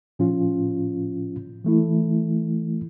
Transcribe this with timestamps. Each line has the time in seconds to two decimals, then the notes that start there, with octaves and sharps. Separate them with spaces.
0.19 A2 F3 C#4 F4
1.64 E3 A3 E4